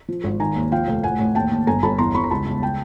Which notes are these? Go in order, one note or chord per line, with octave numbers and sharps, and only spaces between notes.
F3
G#1
D#3 G#5 A#5
D#2
F3 F5 G5
F1
A1 F#5 G#5
A1
D#2 G5 A5
D#2
G1 G#5 A#5
G1 A5 B5
E2 A#5 C6
E2 B5 C#6
A#5
C#2 A5 B5
C#2
G5 A5